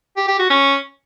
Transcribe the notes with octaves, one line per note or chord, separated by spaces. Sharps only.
G4
G4
F#4
C#4